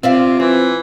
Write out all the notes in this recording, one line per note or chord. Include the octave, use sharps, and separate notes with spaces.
C3 C4 F4 D5 E5 F5
E3 C4